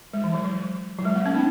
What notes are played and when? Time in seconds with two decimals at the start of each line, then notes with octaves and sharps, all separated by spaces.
0.13 G#3
0.24 E3
0.34 F#3
0.44 F#3
0.99 F#3
1.05 G#3
1.15 A#3
1.26 C#4
1.35 B3 D#4